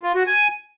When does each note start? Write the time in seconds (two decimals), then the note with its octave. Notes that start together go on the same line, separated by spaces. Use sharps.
0.03 F4
0.15 F#4
0.27 G#5